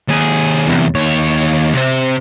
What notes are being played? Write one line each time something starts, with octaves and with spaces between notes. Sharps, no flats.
D#2 G#4
E2 C3
D#2 C#5
C3 C4